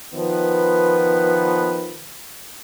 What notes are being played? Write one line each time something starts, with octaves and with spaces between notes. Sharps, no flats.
D#3 F3 B3 B4